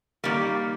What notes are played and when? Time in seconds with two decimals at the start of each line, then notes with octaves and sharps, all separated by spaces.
0.24 D#3 G3 A#3